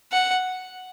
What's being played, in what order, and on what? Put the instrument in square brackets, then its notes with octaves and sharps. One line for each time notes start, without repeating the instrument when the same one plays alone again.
[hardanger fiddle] F#5